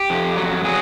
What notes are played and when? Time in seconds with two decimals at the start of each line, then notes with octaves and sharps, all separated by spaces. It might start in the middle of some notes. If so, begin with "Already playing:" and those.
Already playing: G4
0.10 F2
0.37 F#3
0.64 F#3 G#4